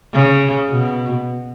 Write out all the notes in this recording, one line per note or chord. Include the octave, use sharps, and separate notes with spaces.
C#3
B2